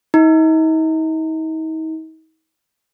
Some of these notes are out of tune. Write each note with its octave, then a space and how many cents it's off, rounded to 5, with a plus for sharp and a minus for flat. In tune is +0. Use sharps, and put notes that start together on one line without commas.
D#4 +40